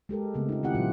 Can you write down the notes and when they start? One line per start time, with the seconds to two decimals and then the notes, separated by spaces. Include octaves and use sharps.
0.09 G#3 G4 A4 A#4
0.34 C#3 A3 B3 C4
0.49 D#4 F4
0.63 D#3 C4 E4 F4 G4 F#5
0.74 A#2 F#3 F4 G4